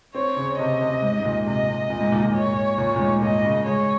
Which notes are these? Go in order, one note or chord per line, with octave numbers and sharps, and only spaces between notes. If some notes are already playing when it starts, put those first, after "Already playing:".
C4 C#5
C#3
C3 D#5
C3
G#2
G#2
A#2
C3 D#5
C3
A#2
G#2
A#2
A#2
C#5
A#2
A#2
G#2
A#2 D#5
C#3
G#3 C#5